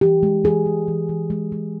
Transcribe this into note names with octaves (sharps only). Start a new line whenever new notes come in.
E3 G4
G#3
E3 G#4
G#3
E3
E3
G#3
G#3